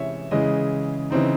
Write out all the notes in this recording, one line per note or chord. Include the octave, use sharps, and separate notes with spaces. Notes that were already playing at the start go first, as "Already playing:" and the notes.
Already playing: C3 E3 G#3 C#4 C#5 E5
C#3 E3 G#3 D#5
C#3 E3 C4 D#4